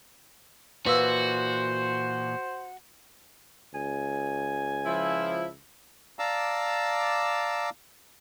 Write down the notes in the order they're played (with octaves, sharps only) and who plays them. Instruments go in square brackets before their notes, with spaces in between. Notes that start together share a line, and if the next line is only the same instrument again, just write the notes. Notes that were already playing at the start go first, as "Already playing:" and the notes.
[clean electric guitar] A#2 E3 [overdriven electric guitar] F#4 [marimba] B4 F5 E6 [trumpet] C5
[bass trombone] C#2 [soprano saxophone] G#5
[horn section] F3 E4
[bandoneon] D5 F5 A5 A#5 D6 E6